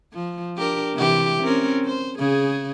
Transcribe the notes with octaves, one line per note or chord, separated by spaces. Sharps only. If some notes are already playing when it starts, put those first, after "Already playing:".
F3
D4 G4 A#4
C3 E3 G4
C4 C#4 A#4
C5
C#3 G#4